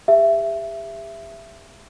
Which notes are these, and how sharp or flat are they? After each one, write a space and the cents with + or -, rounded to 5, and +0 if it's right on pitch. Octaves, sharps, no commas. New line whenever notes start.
G4 +45 E5 +15